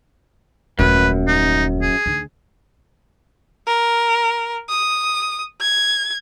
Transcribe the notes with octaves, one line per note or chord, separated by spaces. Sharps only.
D#1 F#2 A3 B4
D#4
G#4
D2 D#4
A#4
D#6
G#6